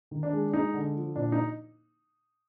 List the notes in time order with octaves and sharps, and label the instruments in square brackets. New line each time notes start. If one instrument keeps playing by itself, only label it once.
[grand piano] D#3
D4
G#3
G#3 D#4
D3
F3
A#2 D4
D#4